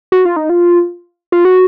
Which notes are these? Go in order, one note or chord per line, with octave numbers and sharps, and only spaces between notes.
F#4
F4
D#4
F4
F4
F#4